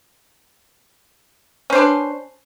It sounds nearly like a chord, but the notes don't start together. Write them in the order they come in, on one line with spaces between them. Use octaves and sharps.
C#4 C5 D4 B4